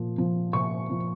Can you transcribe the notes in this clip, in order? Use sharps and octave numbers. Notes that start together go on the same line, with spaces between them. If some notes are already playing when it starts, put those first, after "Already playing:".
Already playing: A#2 F3
F3
A#2 C#6
F3